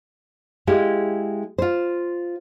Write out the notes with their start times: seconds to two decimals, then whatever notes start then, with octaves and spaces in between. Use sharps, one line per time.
0.67 G#3 E4 G4 F5
1.58 F4 C5